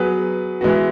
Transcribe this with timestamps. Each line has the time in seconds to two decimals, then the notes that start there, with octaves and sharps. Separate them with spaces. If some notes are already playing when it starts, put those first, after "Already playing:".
Already playing: F#3 B3 G#4 B4
0.61 E3 G#3 B3 F#4